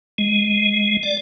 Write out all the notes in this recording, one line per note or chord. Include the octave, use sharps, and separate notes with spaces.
G#3
D5